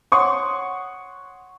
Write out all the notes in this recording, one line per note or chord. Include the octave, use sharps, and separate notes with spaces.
C#5 F#5 C6 C#6 D#6